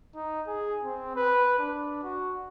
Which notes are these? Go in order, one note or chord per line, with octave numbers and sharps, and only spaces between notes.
D#4
G#4
C4
B4
D4
F#4